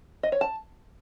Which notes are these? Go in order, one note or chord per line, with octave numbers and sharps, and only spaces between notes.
D#5
C#5
A5